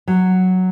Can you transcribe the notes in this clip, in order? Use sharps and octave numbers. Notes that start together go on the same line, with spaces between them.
F#3